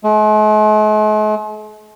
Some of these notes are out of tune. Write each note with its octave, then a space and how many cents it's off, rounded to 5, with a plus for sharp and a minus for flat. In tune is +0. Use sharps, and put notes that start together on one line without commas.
G#3 +45